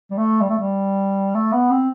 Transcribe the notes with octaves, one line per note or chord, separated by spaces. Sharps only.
G3
A3
G3
A3
G3
A3
B3
C4